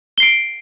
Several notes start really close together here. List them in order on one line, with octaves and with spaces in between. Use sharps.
G7 C7 D7